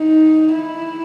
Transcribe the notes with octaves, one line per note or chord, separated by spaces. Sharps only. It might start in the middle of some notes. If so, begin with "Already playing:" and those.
Already playing: D#4
E4